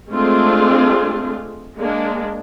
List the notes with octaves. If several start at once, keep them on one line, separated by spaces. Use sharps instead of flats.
G#3 A3 C4 D4 F4 G#4
G#3 A#3 D4